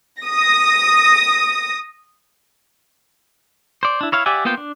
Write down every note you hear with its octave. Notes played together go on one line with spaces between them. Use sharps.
D#6 A#6
C5 D5
D4 E4
E4 C#5 F5
G4 D5 E5 F#5 G#5
A#3 B3 F4 C5 G5
D4